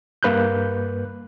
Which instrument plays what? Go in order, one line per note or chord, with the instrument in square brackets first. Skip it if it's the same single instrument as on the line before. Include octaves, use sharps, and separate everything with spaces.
[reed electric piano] G2 A#3 B4 F#6 G6